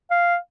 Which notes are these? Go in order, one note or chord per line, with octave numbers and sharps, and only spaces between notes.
F5